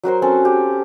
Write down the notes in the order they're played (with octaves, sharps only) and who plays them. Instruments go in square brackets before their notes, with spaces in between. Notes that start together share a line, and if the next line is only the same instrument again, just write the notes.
[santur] F#3 F#4 A#4 C5
C4 C#4 A4
G4